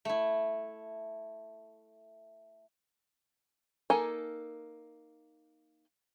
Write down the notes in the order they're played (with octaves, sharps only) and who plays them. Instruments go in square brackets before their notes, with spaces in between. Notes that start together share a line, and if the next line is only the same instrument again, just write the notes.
[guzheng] A3 E4
[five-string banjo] A#3 D#4 A4 G#5